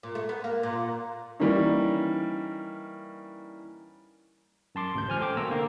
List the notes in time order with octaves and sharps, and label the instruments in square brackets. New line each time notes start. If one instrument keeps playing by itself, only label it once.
[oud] A#2
A3
B3
A#3
A#2
[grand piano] E3 G3 A#3 C#4 D#4
[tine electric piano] F#2 A5 C6 D6
A1 D2 G6
C#2 C5 G#5 F6
A4 C5 G5 D6
C2 B2 A#3 F#4 A#5 E6
D3 A#3